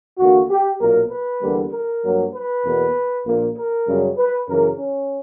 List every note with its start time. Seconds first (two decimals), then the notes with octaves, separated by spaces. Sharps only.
0.19 E2 D3 A#3 F#4
0.49 G4
0.80 B1 A#2 A#3 A#4
1.11 B4
1.42 E2 D3 G3 A#3
1.72 A#4
2.03 G2 F#3 A#3
2.33 B4
2.64 E2 B2 A#3
3.26 A#1 A#2 A#3
3.56 A#4
3.87 F#2 C#3 G3
4.18 B4
4.48 F#2 C#3 E3 A#4
4.78 C#4